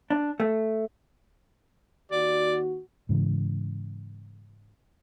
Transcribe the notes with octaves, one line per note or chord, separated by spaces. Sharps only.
D4
A3
D#2 F#4 D5
G#2 C#3 E3